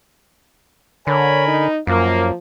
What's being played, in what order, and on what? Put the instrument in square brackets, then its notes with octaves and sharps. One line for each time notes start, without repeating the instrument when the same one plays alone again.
[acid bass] D3 [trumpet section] A#4 G#5 B5 [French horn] C#5
[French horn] D#4
[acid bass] F#2 [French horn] F3 [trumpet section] A#3